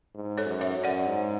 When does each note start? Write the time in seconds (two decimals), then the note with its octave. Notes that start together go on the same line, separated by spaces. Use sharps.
0.15 G#2
0.38 A4 C#5
0.45 F#2
0.61 C#5 E5
0.76 F#2
0.84 D5 F#5
1.07 G#2